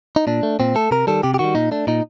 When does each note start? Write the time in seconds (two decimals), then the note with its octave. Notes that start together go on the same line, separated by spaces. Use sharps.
0.16 D#4
0.27 A#2 D4
0.43 A3
0.60 A#2 C4
0.75 A3 A4
0.91 C3 A#4
1.07 D#3 G3 A4
1.23 C3 G4
1.34 G4
1.39 D#3 G3 F#4
1.55 A#2 D#4
1.71 A3 D4
1.87 A#2 D#4